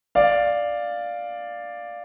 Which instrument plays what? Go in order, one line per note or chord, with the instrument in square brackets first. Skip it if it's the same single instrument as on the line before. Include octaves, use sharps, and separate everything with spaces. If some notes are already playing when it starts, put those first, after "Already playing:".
[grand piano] D5 F5